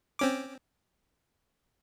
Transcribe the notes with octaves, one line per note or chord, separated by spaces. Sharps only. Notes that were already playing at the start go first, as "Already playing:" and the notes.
C4 C#4 D6